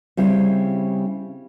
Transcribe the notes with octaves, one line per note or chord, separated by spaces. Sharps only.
C#3 G3 C4 E4